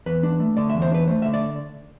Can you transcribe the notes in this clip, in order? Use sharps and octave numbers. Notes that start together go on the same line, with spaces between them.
E2 B4
D4
A3
D3 D5
E5
E2
C5
D4 B4
A3 C5
D3 E5
D5